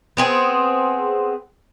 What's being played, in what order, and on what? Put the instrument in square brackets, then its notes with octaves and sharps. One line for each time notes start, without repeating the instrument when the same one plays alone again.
[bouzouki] B3 C4 G#4